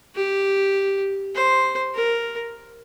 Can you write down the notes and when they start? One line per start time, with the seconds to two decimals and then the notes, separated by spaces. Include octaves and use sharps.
0.16 G4
1.35 C5
1.95 A#4